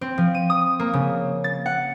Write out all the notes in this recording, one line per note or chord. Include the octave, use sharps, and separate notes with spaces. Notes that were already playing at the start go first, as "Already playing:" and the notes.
C4
F3
D#7
D#6
A#3
C#3
A6
F#5